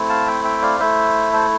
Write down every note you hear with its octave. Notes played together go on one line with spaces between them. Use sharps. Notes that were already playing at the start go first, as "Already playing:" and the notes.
Already playing: A3 C4 E4
F5 A5
E5 G5
E5 G5
D5 F5
A3 E4 C5 E5
A4 C5